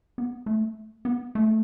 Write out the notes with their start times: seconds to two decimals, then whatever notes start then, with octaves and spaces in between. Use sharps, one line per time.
0.18 B3
0.46 A3
1.05 B3
1.35 A3